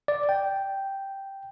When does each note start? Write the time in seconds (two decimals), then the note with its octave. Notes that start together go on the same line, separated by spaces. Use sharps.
0.08 D5
0.29 G5